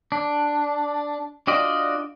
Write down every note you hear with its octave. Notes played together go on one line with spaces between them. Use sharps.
D4
D4 F4 F#4 D5 D#5